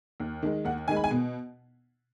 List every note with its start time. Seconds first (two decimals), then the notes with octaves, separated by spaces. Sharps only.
0.20 D#2
0.43 D#3 G#3
0.65 D#2 F#5
0.88 D#3 G#3 G#5
0.96 B5
1.04 G#5
1.11 B2